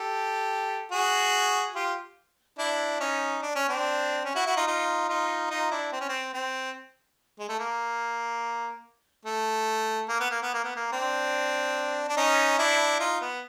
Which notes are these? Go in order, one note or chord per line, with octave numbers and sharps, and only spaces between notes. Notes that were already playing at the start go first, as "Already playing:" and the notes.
Already playing: G4 A4
F#4 G#4
F4 G4
D4 E4
C#4 D#4
D4
C#4
C4 D4
C#4
E4 F#4
E4 F#4
D#4 F4
D#4 F4
D#4 F4
D#4 F4
D4 E4
C4
C#4
C4
C4
G#3
A3
A#3
A3
A#3
B3
A#3
B3
A#3
B3
A#3
C4 D4
D4
C#4 D#4
D4 E4
D#4 F4
B3